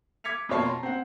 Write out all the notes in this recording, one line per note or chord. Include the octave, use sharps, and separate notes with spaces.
D6 G#6 B6 C#7 F7
F2 B2 A#3 C#5 A5 C7
A#5 C6
C4 F#5